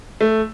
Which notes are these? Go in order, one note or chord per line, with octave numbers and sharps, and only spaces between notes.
A3